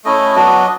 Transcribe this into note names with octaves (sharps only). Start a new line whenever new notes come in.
A3 C#4 E4 D#5
F#3 B3 D4 F#4 D#5